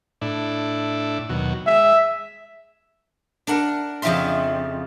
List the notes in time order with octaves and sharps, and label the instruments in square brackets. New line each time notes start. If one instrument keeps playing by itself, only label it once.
[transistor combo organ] A2 D4 E4
D#2 B2 F#3
[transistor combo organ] G#3 [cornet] E5
[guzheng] D4 A#4 F#5
F2 C#3 F3 G4 E5 C6